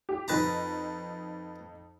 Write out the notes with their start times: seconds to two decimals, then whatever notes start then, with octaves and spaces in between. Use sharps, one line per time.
0.09 G4
0.28 F2 D#4 B4 A5 A#5